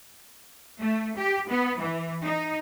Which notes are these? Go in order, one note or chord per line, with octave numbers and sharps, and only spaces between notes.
A3
G4
B3
E3
D#4